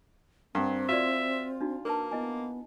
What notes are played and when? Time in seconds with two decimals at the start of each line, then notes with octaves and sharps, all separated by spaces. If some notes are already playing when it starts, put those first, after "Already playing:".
0.55 G2 C4 A#4 F#5 A#5
0.89 F4 F#4 D5 E5
1.61 D4 D#4 F#4
1.85 A#3 A#4 B4 A5
2.11 B3 E4 D#5 G#5